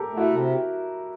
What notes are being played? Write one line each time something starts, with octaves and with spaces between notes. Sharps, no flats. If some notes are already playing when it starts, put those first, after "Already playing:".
Already playing: G4 A4 A#4
A3 E4 F#4
C3